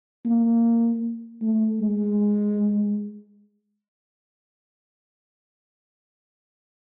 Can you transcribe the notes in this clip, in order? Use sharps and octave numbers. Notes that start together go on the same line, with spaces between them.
A#3
A3
G#3